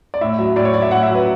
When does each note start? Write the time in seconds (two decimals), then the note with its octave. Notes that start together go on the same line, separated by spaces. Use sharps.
0.14 D5
0.21 A2 E5
0.39 F#3 E5
0.56 A2 D5
0.65 C#5
0.74 F#3 D5
0.82 E5
0.91 A2 F#5
1.03 E5
1.10 F#3
1.15 B4